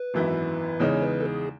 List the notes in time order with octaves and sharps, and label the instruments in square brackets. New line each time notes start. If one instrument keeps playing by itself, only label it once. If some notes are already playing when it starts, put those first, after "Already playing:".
Already playing: [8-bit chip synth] B4
[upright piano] G#1 F#2 E3 B3 E4
[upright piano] E2 C#3 G#3 D#4 [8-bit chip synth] C#5
[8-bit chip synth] B4
A4
G#4